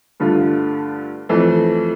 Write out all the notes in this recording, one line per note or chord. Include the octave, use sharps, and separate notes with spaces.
G2 D3 A3 D4 F4
F2 E3 A3